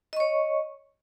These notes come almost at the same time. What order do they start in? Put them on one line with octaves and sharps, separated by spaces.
D#5 C#6 C#5